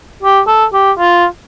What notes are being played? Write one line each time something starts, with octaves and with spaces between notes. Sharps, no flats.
G4
A4
G4
F4